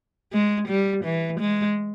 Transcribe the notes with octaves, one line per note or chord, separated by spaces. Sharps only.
G#3
G3
E3
G#3